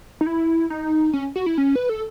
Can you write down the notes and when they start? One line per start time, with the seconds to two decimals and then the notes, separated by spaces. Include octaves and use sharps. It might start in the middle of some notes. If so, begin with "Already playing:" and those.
0.21 D#4
0.26 E4
0.70 D#4
1.13 C#4
1.36 F#4
1.46 E4
1.58 C#4
1.76 B4
1.89 A4